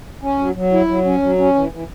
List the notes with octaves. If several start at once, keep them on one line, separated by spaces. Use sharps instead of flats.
C#4
F#3
F#3
E4
F#3
C#4
F#3
C#4
E3
E3